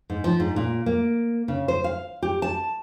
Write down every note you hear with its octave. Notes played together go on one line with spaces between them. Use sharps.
G#2
F3
G#2
A#2
A#3
C#3
C5
F5
G4
A5